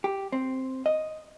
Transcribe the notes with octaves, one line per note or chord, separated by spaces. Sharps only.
G4
C4
D#5